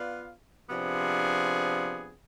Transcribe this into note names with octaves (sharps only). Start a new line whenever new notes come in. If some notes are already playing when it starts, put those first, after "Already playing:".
Already playing: B3 F4 B4 D5 F5
C3 F3 B3 D4 G#4